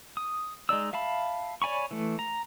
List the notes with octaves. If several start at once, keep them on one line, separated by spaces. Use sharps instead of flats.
D#6
G#3 D#4 D5 E6
E5 F5 A5 B5
C#5 D5 G#5 B5 C#6
E3 A3
A#5